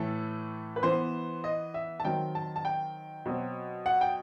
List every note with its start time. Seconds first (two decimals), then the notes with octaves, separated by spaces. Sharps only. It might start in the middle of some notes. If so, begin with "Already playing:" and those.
Already playing: A2 E3 A3 A4
0.76 B4
0.83 E3 B3 C5
1.44 D#5
1.74 E5
2.00 A5
2.05 D#3 F#3 C4 G5
2.35 A5
2.56 A5
2.65 G5
3.26 B2 F#3 C4
3.86 F#5
4.01 G5